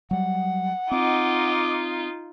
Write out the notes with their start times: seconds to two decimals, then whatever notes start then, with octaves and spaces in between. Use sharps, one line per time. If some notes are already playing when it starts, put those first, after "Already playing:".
0.11 F#3 G3 F#5
0.92 C4 D#4 F4 D#5 D6